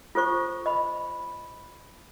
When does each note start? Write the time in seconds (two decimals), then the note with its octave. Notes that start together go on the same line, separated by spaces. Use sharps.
0.15 F4 A4 C5 C#6
0.66 D#5 B5